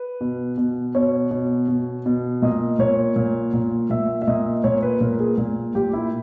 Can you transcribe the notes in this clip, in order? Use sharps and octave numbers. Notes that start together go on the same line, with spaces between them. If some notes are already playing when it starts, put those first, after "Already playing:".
Already playing: B4
B2
B2
B2 C#5
B2
B2
B2
A#2 D#5
A#2 C#5
A#2
A#2
A#2 E5
E5
A#2 D#5
A#2 C#5
B4
A#2 A#4
G#4
A#2
A#2 G4
E4